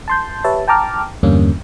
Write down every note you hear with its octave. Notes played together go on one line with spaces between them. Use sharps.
A5 C6 G6
G4 B4 C#5 E5 A5
G5 A5 A#5 D6 F6
E2 G2 D3 G3 A#3 C#4